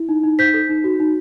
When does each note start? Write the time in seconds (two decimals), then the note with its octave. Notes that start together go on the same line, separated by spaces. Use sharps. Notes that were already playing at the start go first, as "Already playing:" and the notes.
Already playing: E4
0.09 D#4
0.24 D#4
0.39 C5 G6 B6
0.54 A4
0.69 D#4
0.84 F#4
1.00 D#4